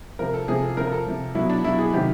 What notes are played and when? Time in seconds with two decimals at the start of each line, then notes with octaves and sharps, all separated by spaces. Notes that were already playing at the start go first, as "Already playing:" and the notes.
0.19 C3 F3 A#4
0.34 A4
0.48 C3 F3 G#4
0.63 A4
0.77 C3 F3 A#4
0.87 A#4
0.92 A4
1.06 C3 F3
1.35 B2 F#3 E4
1.50 D4
1.64 B2 F#3 E4
1.79 G#4
1.93 C3 D#3 F#3 G4